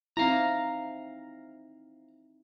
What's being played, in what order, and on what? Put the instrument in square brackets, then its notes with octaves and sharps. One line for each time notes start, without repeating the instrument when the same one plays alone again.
[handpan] C4 D#4 E4 [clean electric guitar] F5 A#5